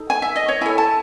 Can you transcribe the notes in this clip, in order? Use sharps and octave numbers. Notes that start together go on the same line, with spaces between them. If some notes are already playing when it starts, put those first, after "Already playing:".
Already playing: D#4 A4
G#5
E5
D#5
C#5
E4 A4 G#5
A5